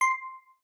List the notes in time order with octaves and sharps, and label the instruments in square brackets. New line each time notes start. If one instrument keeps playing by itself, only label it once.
[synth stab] C6